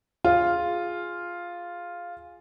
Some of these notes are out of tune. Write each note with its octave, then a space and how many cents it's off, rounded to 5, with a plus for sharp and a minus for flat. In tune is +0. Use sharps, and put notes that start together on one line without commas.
F4 +0 G#4 +0 F5 +0